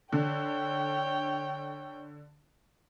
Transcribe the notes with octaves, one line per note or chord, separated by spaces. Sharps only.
D3 C#5 G5